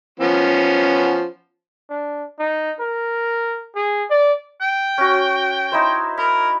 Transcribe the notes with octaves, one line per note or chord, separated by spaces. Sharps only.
F3 B3 C#4
D4
D#4
A#4
G#4
D5
G5
C#4 F#4
D#4 E4 C5
A#4 B5